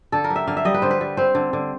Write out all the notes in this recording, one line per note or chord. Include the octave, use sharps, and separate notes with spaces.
D3 A4
A#4
G3
E5
D3 F5
E5
G3 D#5
B4
D3 C5
B4
G3
C4 C5
D3
D3